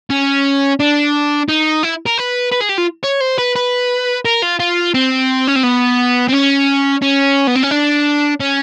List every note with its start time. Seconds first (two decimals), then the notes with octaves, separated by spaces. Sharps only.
0.10 C#4
0.80 D4
1.49 D#4
1.83 E4
2.06 A#4
2.18 B4
2.52 B4
2.61 G#4
2.69 G4
2.78 F4
3.04 C#5
3.21 C5
3.39 B4
3.56 B4
4.25 A#4
4.42 F4
4.59 F4
4.94 C4
5.47 C#4
5.56 C4
5.63 B3
6.28 C4
6.32 C#4
7.02 C#4
7.47 B3
7.56 C4
7.63 C#4
7.71 D4
8.40 C#4